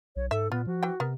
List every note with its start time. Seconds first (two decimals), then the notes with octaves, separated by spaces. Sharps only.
0.16 B1 C#5
0.31 G#2 A4 E5
0.52 A#2 B3 F4
0.67 F3 F#4
0.83 E3 G5
1.00 C3 B3 A#4